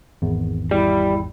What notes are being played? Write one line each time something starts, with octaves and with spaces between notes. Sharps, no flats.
G#1 E2
G3 E4